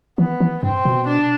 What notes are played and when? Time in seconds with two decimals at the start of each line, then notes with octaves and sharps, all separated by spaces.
0.18 E3 B3
0.40 E3
0.63 G2 C4
0.85 B2
1.07 D4